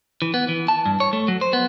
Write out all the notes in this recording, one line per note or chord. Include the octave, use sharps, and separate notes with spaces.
E3
B3
E3
A5
G2
C#5
A3
F#3
C5
B3